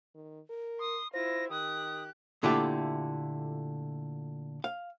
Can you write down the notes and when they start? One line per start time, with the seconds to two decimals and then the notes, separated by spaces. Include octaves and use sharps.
0.15 D#3
0.50 A#4
0.80 C6 D#6
1.14 E4 F4 C5 A#6
1.50 D#3 G4 D#6 F#6
2.43 A#2 D3 A3 E4 F4 G4
4.64 F5